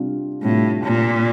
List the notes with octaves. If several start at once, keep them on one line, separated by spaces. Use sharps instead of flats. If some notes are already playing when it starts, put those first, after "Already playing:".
Already playing: C3 G3 D4 F4
A2 C3 G3 D4 F4
A#2